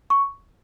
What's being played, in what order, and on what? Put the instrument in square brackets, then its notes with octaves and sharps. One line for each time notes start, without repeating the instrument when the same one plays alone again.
[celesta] C#6